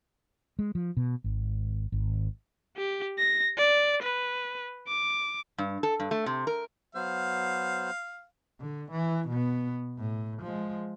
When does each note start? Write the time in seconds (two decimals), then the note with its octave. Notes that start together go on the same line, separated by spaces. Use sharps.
0.59 G#3
0.75 F3
0.97 B2
1.24 G#1
1.92 G#1
2.77 G4
3.19 A#6
3.58 D5
4.03 B4
4.88 D6
5.58 G2
5.83 A4
6.00 G2
6.11 A3
6.26 C3
6.47 A#4
6.95 F#3 B3 C5 F5
8.60 D3
8.91 E3
9.28 B2 B3
9.98 A2
10.42 F3 G#3